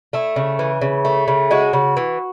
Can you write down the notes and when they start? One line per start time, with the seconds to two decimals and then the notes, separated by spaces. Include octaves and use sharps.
0.13 A3 E4
0.36 C#3
0.59 E3
0.81 C#3
1.05 A3
1.28 C#3
1.51 G#3 F#4
1.73 C#3
1.97 E3